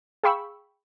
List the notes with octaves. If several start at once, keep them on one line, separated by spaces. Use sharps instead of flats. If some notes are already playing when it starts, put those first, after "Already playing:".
G#4 F5 G5 B5 C#6 E6